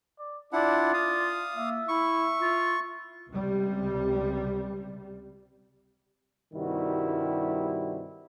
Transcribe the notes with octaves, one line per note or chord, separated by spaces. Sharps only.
D5
D4 E4 F4 D5 F#5
F5 D#6
A#3 E5
E4 C#6
F4
C#2 C3 G3
G2 C3 D#3 G3 E4 F#4